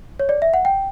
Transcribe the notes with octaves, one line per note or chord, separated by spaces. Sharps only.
C#5
D5
E5
F#5
G5